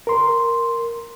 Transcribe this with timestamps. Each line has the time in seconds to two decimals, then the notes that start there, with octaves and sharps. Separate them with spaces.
0.07 A#4 C6